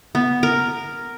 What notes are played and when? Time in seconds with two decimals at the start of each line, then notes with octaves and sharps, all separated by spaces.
0.15 B3
0.43 A#4